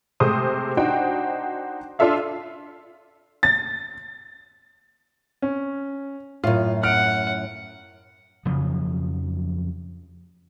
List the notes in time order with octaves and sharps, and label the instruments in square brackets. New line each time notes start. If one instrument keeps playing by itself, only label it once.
[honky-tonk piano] C3 G#3 A3 C5 D#6
D4 D#4 F#4 C5 G5
D4 F4 A4 E5 F5
A6
[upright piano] C#4
[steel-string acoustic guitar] F#2 A2 [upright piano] F4
[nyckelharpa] F#5 [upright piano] F6 D7
[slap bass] F2 C#3 F3 F#3